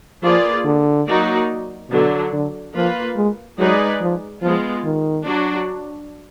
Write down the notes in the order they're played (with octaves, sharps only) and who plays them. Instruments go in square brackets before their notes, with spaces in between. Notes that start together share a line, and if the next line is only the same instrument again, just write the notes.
[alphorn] F3 [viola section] A#3 F4 G#4 B4 D5
[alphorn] D3
[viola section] F#3 A#3 D#4 F#4 D5
[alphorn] B2 [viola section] D3 F#3 D4
[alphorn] D3
[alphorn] F3 [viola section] A#3 F4 B4
[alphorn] G#3
[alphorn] F#3 [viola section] G#3 D#4 G#4 B4 D5
[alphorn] F3
[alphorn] F3 [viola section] G#3 B3 F4
[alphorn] D#3
[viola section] F#3 D4 F#4